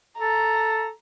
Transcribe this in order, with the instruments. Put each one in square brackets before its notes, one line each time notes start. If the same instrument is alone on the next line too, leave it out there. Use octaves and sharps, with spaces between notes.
[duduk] A4 [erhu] A#5